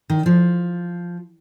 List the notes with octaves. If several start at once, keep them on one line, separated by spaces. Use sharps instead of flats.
D#3
F3